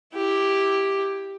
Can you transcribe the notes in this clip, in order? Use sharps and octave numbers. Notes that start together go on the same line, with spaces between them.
E4 G4